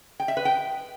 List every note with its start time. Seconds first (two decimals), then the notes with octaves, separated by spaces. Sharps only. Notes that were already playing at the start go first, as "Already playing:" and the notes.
0.20 G5
0.28 E5
0.37 B4
0.45 G5